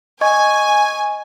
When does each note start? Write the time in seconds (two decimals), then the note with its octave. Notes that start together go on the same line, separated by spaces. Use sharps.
0.21 D#5 G#5 C#6 G#6